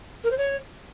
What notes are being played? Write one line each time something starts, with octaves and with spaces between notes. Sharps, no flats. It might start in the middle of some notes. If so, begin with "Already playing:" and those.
A#4
C5
C#5